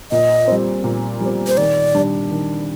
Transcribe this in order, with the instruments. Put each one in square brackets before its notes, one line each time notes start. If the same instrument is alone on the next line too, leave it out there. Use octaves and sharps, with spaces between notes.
[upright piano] A#2 [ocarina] D#5
[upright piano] G3 C4
A#2
G3
C4
[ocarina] C5
[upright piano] D#3 [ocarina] D5
[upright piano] G3 D4
D#3